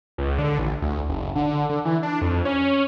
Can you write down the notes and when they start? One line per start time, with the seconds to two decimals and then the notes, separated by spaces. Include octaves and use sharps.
0.18 C#2
0.38 D3
0.59 A1
0.82 D2
1.09 F#1
1.35 D3
1.69 D3
1.85 E3
2.03 D4
2.21 F2
2.45 C#4